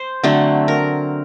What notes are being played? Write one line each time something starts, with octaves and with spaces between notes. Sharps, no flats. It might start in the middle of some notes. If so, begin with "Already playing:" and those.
Already playing: C5
D3 F#3 A3 C4
A#4